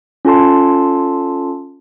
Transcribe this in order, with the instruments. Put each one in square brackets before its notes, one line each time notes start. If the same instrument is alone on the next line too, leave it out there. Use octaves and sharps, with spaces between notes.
[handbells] C#4 F4 A4 A5 C6